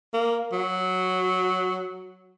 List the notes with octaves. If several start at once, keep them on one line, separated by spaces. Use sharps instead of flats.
A#3
F#3